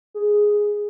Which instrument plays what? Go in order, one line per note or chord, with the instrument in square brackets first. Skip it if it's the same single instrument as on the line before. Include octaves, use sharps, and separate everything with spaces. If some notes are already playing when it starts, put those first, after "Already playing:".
[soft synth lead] G#4